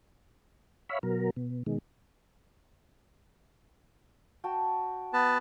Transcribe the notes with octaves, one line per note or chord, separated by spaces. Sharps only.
C#5 E5 F5 B5
B2 F#3 A#4
B2
B2 D#3 G#3
F#4 G5 A5
B3 B4 A5